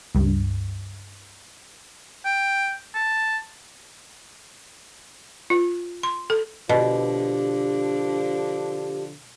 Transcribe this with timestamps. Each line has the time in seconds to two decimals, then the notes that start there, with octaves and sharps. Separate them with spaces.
0.15 C#2 G2
2.25 G5
2.95 A5
5.50 F4
6.03 C6
6.30 A4
6.69 B2 D3 F3 D4 G4